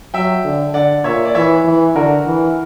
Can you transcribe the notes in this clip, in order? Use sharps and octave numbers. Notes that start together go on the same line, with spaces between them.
F#3 E5 G5
D3
D3 D5 F#5
A#2 C#5 E5
D5
E3 C#5 E5
E3
D3 F#4 A#4
E3